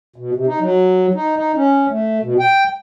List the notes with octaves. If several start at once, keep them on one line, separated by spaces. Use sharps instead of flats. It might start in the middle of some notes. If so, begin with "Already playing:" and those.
B2
C3
D#4
F#3
D#4
D#4
C#4
A3
B2
G5